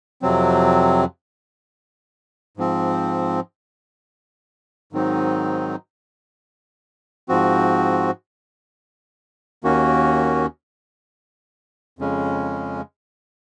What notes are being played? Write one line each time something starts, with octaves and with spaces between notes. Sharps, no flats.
F2 C3 F#3 C4
G#2 F3 C4
G#2 D#3 F#3 C4 D#4
G#2 F3 C4 F#4
D#2 D#3 A#3 C#4 F#4
F2 C#3 G#3 C#4